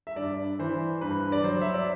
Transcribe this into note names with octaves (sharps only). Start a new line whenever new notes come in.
E5
G2 D5
E3 C5
G2 B4
D5
F#3 C5
E5
D5